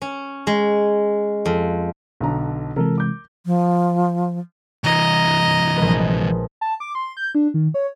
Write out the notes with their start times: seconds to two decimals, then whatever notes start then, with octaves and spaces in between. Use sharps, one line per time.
0.02 C#4
0.47 G#3
1.46 F2
2.20 B1 D3 A#5
2.76 C3 E3 G#3 A4 A#4
2.98 D6 G6
3.46 F3
4.84 C2 E3 D#5 A#5
5.77 A#1 G#3 B4
6.61 A5
6.80 D6
6.95 C6
7.17 G6
7.35 D4
7.54 D#3
7.74 C#5